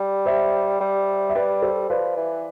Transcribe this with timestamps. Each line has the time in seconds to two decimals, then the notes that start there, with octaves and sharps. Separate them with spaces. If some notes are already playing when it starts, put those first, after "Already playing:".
Already playing: G3
0.26 C5 E5
0.80 G3
1.29 E5
1.35 G3 B4 D5
1.62 A4 C5
1.90 F3 B4 D5
2.17 E3